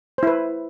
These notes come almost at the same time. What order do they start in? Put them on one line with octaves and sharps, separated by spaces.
C5 E4 B4